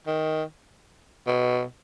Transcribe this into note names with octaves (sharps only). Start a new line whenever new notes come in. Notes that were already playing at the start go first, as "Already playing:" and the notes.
D#3
B2